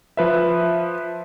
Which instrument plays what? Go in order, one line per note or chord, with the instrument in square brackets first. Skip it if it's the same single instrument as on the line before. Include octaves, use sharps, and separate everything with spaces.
[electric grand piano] F3 B4 E5